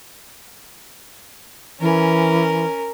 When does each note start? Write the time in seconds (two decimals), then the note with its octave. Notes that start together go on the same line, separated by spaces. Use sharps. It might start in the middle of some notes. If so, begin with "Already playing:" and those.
1.80 E3 C#4 A#4